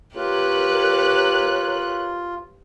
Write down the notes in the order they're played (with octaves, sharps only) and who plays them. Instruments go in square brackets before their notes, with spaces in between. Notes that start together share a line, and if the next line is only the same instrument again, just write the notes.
[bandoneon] F4 [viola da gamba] G4 B4 [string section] A#4 C#5 F#6